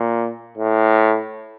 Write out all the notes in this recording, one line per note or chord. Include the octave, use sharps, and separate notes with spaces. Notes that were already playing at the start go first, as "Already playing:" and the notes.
Already playing: A#2
A2